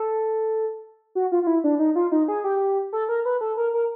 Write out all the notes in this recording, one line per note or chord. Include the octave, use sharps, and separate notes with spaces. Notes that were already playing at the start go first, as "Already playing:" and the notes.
Already playing: A4
F#4
F4
F4
E4
D4
D#4
F4
D#4
G#4
G4
A4
A#4
B4
A4
A#4
A#4